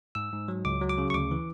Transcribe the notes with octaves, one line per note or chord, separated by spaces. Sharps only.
G#2 E6
G#2
F#3
C#2 D6
F#3
D6
C#3
C#6
D2 D6
E3